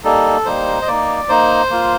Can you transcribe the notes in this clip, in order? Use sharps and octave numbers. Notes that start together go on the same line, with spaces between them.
G3 A#3 D#4 A4
G3 A#3 D#4 C5
D#5
A#3 D#4 D5
A#3 D#4 C5
A#3 F4